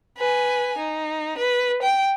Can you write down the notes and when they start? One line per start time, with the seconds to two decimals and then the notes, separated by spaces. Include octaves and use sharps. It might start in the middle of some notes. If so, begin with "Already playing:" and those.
0.18 B4 G#5
0.78 D#4
1.38 B4
1.83 G5